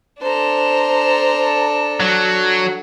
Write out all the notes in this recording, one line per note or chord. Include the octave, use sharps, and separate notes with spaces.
D4 A4 C5 A#5
F#3